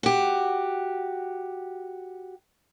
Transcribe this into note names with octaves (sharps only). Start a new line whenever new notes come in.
F#4 G4